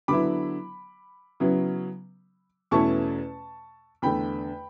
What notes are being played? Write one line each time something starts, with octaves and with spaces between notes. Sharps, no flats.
D3 F#3 B3 E4 B5 D6
C#3 F#3 B3 E4
E2 B2 A3 C#4 E4 A5 C#6
E2 D3 A3 G5 B5